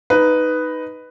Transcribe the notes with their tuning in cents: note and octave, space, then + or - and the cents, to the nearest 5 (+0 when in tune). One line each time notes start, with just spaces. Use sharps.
D#4 +0 B4 +5